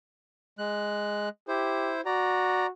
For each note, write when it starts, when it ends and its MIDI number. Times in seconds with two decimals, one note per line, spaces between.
0.58 1.29 56
0.58 1.29 90
1.48 2.01 64
1.48 1.94 67
1.48 2.01 72
2.06 2.70 66
2.06 2.67 74
2.06 2.67 82